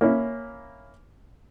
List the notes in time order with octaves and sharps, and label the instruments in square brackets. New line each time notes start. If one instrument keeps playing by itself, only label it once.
[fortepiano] A#3 C#4 E4